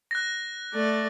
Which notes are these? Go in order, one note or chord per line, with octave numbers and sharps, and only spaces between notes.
F#6 A#6
A3 D5